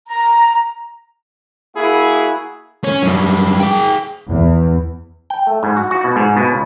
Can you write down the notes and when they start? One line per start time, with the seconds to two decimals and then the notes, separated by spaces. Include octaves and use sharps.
0.08 A#5
1.75 A#3 E4 F#4 G#4
2.84 C#4
3.03 F#2 G3
3.60 G#4 G5
4.29 E2
5.30 G5
5.47 A3
5.63 G#2
5.77 F#4
5.91 F#4
6.04 B2
6.16 G#2
6.37 B2
6.51 C#2